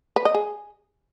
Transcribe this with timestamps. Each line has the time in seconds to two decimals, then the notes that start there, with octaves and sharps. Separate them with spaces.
0.16 B4
0.25 D#5
0.34 G#4